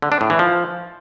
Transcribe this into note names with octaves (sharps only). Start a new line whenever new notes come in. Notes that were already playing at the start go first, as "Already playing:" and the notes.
D3
D4
A2
E3
F3